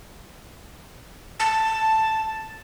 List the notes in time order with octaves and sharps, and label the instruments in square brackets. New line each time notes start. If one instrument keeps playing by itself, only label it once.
[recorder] A5